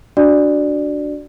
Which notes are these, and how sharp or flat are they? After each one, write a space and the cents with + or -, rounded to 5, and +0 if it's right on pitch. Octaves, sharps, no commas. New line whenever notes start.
D4 +0 F#4 +0 D5 +10